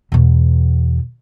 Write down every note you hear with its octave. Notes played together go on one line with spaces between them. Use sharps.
E2 B2